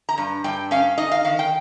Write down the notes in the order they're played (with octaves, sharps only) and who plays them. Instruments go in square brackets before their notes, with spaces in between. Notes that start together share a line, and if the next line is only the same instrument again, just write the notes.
[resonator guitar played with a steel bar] A#5
G2
G2 G5
C#4 F5
D#4 D#5
F5
D#3 F5
G5